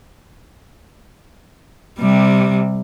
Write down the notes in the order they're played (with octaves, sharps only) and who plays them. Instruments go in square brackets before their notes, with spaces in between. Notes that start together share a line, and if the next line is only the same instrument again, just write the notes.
[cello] C3 G3